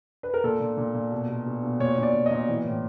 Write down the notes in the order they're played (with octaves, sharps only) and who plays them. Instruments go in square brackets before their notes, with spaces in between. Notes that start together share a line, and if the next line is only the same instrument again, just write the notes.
[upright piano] B4
A#4
A#2 A4
A#2
A#2
A#2
B2
B2
B2
B2
A#2 C#5
A#2
D5
A#2
D#5
A#2
E3
A2